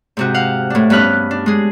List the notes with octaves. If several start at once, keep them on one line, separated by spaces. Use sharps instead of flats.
G#2 C3 F#4
F5 F#5
A2 D4
G2 B3 C#4 B5 F6 F#6
D4
G#3 G#4